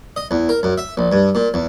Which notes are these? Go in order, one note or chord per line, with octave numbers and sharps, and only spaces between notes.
D#5
E2
A#4
F#2
E5
A#1
G2
A#2
E2